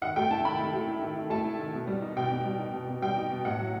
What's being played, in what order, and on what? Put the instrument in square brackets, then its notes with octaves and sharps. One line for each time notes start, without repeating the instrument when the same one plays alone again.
[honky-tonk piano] D#3 F#5
A3 G5
E4 A5
D#3 B5
D#3
A3
E4
D#3
D#3
A3 A5
E4
D#3
B2
G3
D#4
B2 G5
B2
G3
D#4
B2
B2
G3 G5
D#4
B2
A2 F#5
F#3